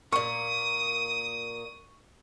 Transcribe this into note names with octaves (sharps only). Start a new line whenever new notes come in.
A#2 A#3 C#6 D#6